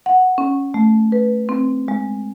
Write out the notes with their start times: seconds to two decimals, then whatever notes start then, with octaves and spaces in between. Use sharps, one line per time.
0.06 F#5
0.38 C#4
0.74 A3
1.12 B4
1.49 C4
1.88 G#3